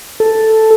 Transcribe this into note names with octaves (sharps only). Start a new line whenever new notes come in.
A4